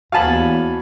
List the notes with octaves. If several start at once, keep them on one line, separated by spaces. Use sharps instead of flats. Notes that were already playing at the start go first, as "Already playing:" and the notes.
D#2 F#4 F5 G#5 A5 B5
E2